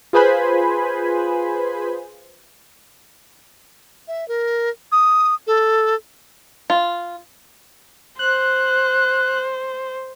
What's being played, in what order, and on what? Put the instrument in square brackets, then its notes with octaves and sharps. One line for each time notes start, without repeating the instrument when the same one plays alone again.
[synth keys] F4 G#4 B4 C5 G#5 B5
[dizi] E5
A#4
D#6
A4
[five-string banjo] F4
[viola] C5 [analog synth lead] F#6